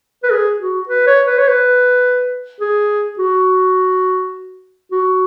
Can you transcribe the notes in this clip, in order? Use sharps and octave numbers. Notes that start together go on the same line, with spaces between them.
B4
G#4
F#4
B4
C#5
B4
C#5
B4
G#4
F#4
F#4